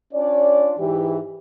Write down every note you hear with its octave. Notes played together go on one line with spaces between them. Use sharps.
C#4 D4 F4 C#5 D5
G#2 E3 G4